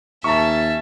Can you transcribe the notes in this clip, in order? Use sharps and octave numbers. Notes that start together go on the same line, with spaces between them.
D#2 C#4 E5 A5 A#5 C#6